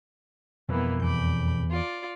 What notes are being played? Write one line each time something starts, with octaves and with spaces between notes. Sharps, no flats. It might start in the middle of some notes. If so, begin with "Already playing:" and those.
F2 B2 E3 F3 G3 A#3 B3
E2 B5 D6 G6
F4 D5